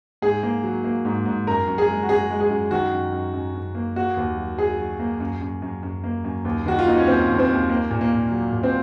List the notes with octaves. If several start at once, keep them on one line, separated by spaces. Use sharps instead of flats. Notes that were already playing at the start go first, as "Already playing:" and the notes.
G#2 G#4
A#3
F#3
A#3
G#2
G#2
F#2 A#4
F#2
G#4
G#3
F#4
F#2 G#4
G#3
G#4
F#2
D#3 F#4
F#2
F#2
F#2
F#2
A#3
A#3 F#4
D#2
F#3
F#3 G#4
F#3
A#3
F#2
F#2
F#2
F#2
A#3
F#2
D#2
D#3 F#4
F4
A#3 D#4
C#4
D#2 C4
D#2
C4
D#2
A#3
A#2
A#3
A#2
F#3
A#2
C4